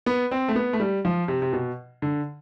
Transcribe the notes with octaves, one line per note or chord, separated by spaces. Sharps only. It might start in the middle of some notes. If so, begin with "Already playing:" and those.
B3
C4
A3
B3
A3
G3
F3
C3
C3
B2
D3